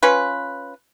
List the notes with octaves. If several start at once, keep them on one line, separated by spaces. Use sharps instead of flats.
C#4 F4 B4